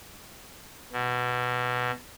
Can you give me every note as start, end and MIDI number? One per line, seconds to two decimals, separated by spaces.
0.92 1.91 47